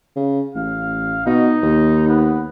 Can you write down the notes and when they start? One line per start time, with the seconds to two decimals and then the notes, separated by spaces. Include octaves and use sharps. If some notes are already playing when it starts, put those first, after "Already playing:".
0.16 C#3
0.55 A1 F5
1.26 B2 D#4
1.63 D#2
2.08 B3